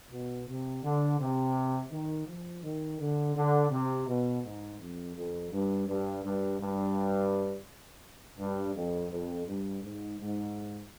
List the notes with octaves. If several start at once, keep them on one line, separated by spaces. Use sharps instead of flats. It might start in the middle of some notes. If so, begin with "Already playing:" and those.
B2
C3
D3
C3
D#3
F3
D#3
D3
D3
C3
B2
G#2
F2
F2
G2
G2
G2
G2
G2
F2
F2
G2
G#2
G#2